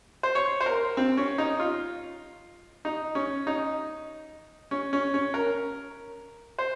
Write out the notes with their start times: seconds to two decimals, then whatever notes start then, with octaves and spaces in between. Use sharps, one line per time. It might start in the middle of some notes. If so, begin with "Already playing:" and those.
0.23 C5
0.35 C#5
0.60 C5
0.66 A#4
0.97 C4
1.17 C#4
1.38 D#4
1.60 F4
2.85 D#4
3.15 C#4
3.47 D#4
4.71 C#4
4.93 C#4
5.14 C#4
5.34 A#4
6.59 C5